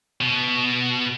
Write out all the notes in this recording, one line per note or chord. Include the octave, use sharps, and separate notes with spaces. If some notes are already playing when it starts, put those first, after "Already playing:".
B2